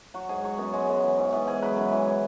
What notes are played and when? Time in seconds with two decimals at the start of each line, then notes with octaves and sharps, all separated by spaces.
0.14 F#3 F#4
0.29 G#2 G#4
0.44 F#3 C#5
0.58 F#2 B3
0.73 F#3 G#3
0.89 F#2
1.03 E3
1.18 G#2
1.32 E3 B3
1.47 G#2 G#4
1.62 F#3 B4
1.77 F#2
1.92 E3